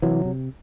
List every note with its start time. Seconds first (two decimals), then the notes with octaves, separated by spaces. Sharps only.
0.02 C3 E3 F#3
0.25 C3